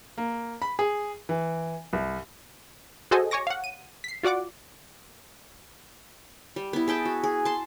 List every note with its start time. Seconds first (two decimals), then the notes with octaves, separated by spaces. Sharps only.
0.18 A#3
0.62 B5
0.79 G#4
1.29 E3
1.93 C2
3.11 F#4 G#4 A4 C5 D#5 G#5
3.31 C#5 G#5 C#6 D6 A#6
3.47 F5 F#5
3.64 D#7
4.04 B6 C7
4.23 F4 F#4 D5 F#5 D6
6.56 G3
6.73 B3 E4
6.88 G#4 E5 G5 A5
7.05 F#4
7.24 G#4
7.45 A5 C6